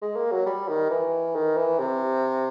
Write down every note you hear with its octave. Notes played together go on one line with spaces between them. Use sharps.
G#3
A#3
F#3
G3
D#3
E3
D#3
E3
C3